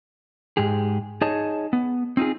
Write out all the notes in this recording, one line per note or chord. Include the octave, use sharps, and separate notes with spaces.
G#2 G#3 G4 G#4
D#4 G#4 C#5 D#5 A5
B3
C4 D#4 F4 G#4